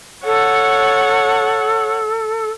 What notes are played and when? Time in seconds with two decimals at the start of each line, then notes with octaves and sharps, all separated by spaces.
0.25 A4 C#5 F#5